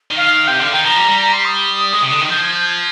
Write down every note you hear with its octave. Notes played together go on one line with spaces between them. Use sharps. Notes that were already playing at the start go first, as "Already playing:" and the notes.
D#3
F5
C3 G5
D3 F5
D#3 G5
F3 A#5
G3
G3
A#5
C6
D#6
G#3
C3
D3
D#3
F3 G6
G#6
G6
G#6